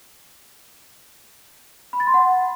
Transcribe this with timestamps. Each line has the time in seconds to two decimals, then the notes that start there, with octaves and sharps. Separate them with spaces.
1.93 B5
2.00 A6
2.07 C6
2.14 F#5